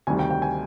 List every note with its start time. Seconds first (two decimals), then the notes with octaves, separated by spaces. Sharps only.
0.07 D2 C3 D#3 G3 G#5
0.19 G5
0.30 G5
0.42 G#5